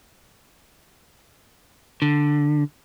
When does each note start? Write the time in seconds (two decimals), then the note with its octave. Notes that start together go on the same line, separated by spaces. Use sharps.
2.02 D3